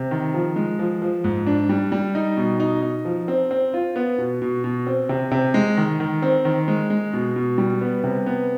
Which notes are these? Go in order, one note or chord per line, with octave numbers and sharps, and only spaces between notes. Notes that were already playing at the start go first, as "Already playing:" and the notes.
Already playing: C3
D#3
F3
G#3
F3
F3
G#2
D4
G3
G3
D#4
B2
D#4
D#4
F3
C4
C4
F4
B3
B2
B2
B2
C4
C3
C3
G#3
D#3
D#3
C4
D#3
G#3
G#3
B2
B2
G3
B3
C3
B3